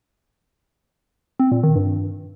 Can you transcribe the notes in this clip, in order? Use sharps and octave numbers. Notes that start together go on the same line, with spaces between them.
C4
A#2
D#3
G2